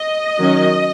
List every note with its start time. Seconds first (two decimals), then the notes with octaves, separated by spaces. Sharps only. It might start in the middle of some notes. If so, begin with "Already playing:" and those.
Already playing: D#5
0.38 D#3 F#3 C#4